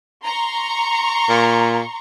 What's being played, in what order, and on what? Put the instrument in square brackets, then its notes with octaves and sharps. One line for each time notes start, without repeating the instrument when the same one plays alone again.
[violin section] A#5 C6 C#6
[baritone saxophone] A#2